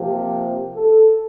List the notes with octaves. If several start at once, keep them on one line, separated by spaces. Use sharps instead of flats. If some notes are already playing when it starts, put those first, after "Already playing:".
Already playing: C3 F3 A#3 G4
A4